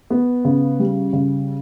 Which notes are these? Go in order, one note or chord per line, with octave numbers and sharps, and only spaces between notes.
B3
C#3
G3
C#3